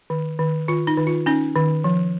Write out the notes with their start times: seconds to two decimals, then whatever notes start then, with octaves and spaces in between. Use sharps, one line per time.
0.10 D#3
0.39 D#3
0.68 D#3 F4
0.87 D#4
0.97 D#3
1.07 F4
1.26 C#4 D#4
1.56 D#3
1.84 F3